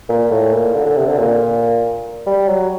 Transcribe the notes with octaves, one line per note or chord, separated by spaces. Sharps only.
A#2
A2
A#2
D3
D3
C3
D3
A#2
G3
F#3